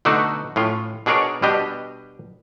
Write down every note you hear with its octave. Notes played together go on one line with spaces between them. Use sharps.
B2 D3 A3 D4 D#4 F#4
A2 C#4 F4
B2 D4 G#4 A#4 C#5 D5
B2 G3 D4 G4 D#5